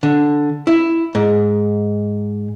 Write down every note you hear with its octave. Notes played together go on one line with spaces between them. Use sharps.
D3
E4
G#2